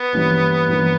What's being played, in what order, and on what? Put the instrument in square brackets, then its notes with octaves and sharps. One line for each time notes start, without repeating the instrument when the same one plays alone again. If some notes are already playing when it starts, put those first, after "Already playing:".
Already playing: [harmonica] B3
[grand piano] G2 E3 G3 A#3 C#4
G2 E3 G3 A#3 C#4